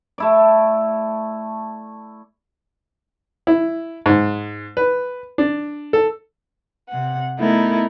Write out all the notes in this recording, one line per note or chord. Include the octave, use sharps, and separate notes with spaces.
A3 E4 D5
E4
G#2
B4
D4
A4
C3 F#5
A3 B3 D#4 E4 A#4